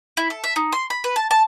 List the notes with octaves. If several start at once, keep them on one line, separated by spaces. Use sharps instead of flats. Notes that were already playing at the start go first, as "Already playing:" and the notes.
E4
A4
E5
D#4
C6
B5
B4
A5
A5